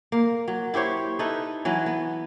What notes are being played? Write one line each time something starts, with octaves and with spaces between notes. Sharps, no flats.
A#3
F#3
E4 G4 C5 C#5
D#4 E4 A4 B4
E3 F#3 B4
B3